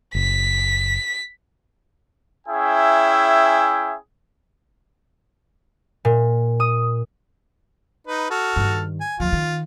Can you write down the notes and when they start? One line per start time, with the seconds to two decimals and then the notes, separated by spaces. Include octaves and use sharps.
0.15 F#1 B6
2.47 C#4 E4 G#4 E5 G5
6.05 A#2
6.60 D#6
8.07 D#4 B4
8.30 F#4 A4 F6
8.56 G2 D#3
9.00 G#5
9.20 D#2 F3 F4
9.33 D#3